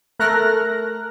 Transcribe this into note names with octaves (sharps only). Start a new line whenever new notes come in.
A3 A#4 F6 F#6 A#6